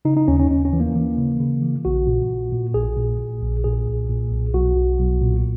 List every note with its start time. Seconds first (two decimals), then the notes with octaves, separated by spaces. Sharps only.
0.05 C#3 D#4
0.17 D#4
0.28 D#2 C#4
0.39 C#4
0.50 D#2 C#4
0.65 C#4
0.73 E3
0.80 A#3
0.95 E3
1.18 C#3
1.40 C#3
1.62 E3
1.85 A#1 F#4
2.07 A#2
2.30 A#2
2.53 A#2
2.74 A#1 G#4
2.97 A#2
3.19 A#2
3.42 A#1
3.64 A#2 G#4
3.87 B1
4.09 A#2
4.31 B1
4.54 B1 F#4
4.77 B1
4.99 B1
5.22 A#2